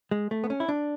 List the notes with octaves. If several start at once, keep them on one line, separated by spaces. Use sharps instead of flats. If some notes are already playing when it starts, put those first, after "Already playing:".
G#3
A3
B3
C#4
E4
D4